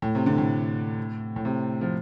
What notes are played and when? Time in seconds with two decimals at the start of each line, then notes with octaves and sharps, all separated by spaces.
0.02 A2
0.15 C3
0.26 D3
0.38 A2
1.36 A2
1.45 C3
1.81 F3